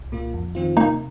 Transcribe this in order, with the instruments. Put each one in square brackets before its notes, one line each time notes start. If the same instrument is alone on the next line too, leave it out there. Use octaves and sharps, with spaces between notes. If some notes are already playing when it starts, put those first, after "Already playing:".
Already playing: [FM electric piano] C2
A#2 A#3 F4
F2
D#3 C4 F4
[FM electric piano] C3 [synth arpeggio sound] A#3 D#4